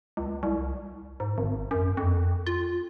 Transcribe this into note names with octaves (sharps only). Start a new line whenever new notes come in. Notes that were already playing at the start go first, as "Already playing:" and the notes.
C#2
C2
G#2
G#1
F#2
F2
F4